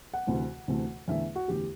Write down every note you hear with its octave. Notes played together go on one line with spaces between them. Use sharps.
F#5
D2 C3 E3 A3
D2 C3 E3 A3
E2 D3 A3 E5
F#4
E2 D3 A3 G4